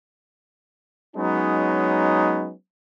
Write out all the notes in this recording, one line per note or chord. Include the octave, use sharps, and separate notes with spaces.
F#3 G#3 B3 C#4 D#4